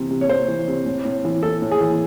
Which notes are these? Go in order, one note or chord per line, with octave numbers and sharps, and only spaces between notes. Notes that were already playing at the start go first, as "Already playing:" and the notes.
Already playing: C3 E3
C3
C#5
C3 C5
E3
C3
A2
A2
E3
E3 A4
A2
G#4
E3